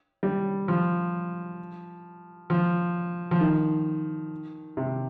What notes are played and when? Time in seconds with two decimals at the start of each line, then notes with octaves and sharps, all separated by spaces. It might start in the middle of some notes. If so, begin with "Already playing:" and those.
0.23 G3
0.68 F3
2.50 F3
3.31 F3
3.41 D#3
4.77 C3